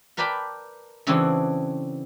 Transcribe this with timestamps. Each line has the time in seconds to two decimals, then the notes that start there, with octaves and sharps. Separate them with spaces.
0.17 A#4 B4 D5 G5 A5 B5
1.07 C#3 E3 C4 D4 F#4 A4